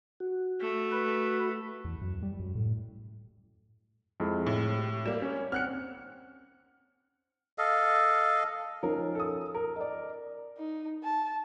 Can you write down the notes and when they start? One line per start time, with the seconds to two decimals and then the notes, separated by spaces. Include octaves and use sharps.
0.20 F#4
0.61 A3
0.91 B4
1.85 E2
2.01 F#2
2.23 G3
2.40 F#2
2.55 A2
4.20 F2 G#3 E4
4.46 A2
4.78 G4
5.06 G3 A#3 E7
5.22 C#4 C#5
5.52 C4 F#5 F6 F#6 C#7
7.58 A4 D#5 F5
8.83 F3 C#4 D#4 A#4
9.15 A4 D#6
9.54 A#4
9.76 D5 D#5
10.57 D#4
11.03 A5